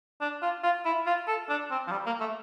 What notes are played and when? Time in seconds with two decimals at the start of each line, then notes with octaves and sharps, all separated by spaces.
0.21 D4
0.42 F4
0.63 F4
0.85 E4
1.06 F4
1.28 A4
1.49 D4
1.71 C4
1.87 F3
1.91 G3
2.06 A#3
2.20 A3